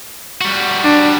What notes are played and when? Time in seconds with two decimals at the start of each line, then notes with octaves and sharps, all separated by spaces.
0.41 G3 F#4
0.84 D4